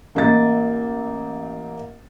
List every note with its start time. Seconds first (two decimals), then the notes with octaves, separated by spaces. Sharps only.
0.15 A1 A#3 D#5 A6